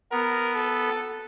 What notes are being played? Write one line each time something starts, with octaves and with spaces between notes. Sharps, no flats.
B3 A#4
A4